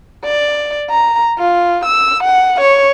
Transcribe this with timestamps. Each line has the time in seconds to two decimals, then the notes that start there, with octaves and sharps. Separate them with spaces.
0.24 D5
0.90 A#5
1.38 F4
1.85 E6
2.24 F#5
2.61 C#5